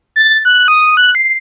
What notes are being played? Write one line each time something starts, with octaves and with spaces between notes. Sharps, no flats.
A6
F#6
D#6
F#6
C7